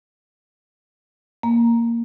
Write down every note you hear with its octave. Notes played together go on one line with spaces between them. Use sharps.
A#3